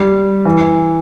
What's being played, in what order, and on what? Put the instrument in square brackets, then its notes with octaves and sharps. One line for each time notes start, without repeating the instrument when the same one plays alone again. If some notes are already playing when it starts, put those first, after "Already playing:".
Already playing: [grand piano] G3
E3